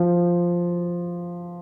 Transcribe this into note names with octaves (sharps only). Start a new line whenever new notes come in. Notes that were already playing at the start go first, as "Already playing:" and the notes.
Already playing: F3